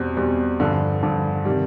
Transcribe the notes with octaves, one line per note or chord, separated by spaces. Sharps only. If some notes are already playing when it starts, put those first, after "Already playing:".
Already playing: E2 B2 G3 C4
E2 B2 G3 C4
G2 D3 F3
G2 D3 F3
C3 D#3 G3